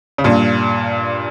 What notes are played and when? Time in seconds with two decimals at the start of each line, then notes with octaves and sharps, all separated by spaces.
0.18 C#3
0.24 G2 A#2